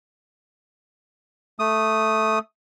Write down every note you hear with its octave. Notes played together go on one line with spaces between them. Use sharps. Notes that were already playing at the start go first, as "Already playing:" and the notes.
A3 D#6